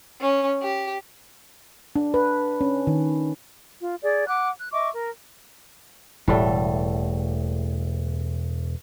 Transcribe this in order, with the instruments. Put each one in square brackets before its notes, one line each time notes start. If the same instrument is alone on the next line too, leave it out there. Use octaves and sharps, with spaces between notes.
[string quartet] C#4
G4
[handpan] D4
B4
C#4
D#3
[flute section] F4
G#4 D5
F#5 D6 F#6
F#6
D#5 E5 C#6 D6
A#4
[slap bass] E1 [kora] A2 G3 A3